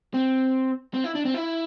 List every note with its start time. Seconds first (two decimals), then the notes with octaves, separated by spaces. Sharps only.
0.14 C4
0.94 C4
1.04 E4
1.15 D4
1.25 C4
1.34 E4